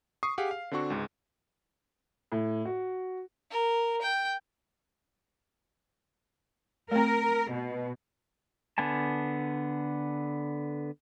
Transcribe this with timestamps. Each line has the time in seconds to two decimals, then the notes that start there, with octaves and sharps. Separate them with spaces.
0.23 C#6 D#6 C7
0.38 G4 G#4 F5 F#5 G#5
0.51 F5
0.71 D3 C4 D4 F#4 C#6
0.90 C#2 G#2
2.32 A2
2.65 F#4
3.51 A#4
4.02 G5
6.91 A3 C4 A#4
7.51 B2
8.78 D3 B3 G#5 A5